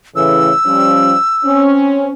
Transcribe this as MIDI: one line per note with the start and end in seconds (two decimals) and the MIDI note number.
0.16 0.51 45
0.16 0.51 49
0.16 0.51 52
0.16 1.62 88
0.66 1.15 53
0.66 1.15 55
0.66 1.15 61
1.45 2.13 60
1.45 2.13 61